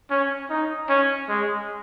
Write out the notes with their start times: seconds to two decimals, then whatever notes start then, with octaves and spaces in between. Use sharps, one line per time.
0.10 C#4
0.50 D#4
0.89 C#4
1.29 G#3